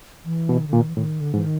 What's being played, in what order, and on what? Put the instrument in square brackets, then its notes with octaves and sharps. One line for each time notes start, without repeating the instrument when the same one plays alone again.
[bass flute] E3
[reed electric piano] B2
[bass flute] D#3
D3
[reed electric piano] A#2 [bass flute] D#3
[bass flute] E3
[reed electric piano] A2 [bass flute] D#3
[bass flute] D3
[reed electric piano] G#2 [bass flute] E3
[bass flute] D#3